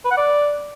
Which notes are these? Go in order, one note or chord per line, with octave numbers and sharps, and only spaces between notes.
B4
F#5
D5